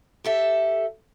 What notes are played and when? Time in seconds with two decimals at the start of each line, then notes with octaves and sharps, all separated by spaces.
0.24 G4 A4 E5